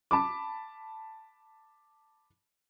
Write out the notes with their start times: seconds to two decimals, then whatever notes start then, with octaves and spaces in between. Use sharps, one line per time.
0.11 A5 B5 D6